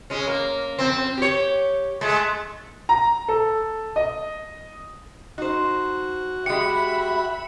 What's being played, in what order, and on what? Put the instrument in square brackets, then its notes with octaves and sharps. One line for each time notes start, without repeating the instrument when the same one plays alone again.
[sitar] G#3 C#4
A#3
F2 C4
G4 C#5
G#3 A3
[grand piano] A#5
A4
D#5
[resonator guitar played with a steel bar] D#4 C5 [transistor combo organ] F#4
[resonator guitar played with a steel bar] G#3 G4 [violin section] E5 B5 [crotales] C#7